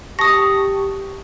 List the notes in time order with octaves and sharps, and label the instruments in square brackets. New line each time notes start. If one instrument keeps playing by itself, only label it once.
[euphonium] G4 [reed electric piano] A5 C#6 [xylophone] D#6 A#6